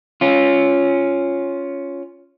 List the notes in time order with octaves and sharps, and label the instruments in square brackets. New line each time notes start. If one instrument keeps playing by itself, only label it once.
[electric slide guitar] C#4 F4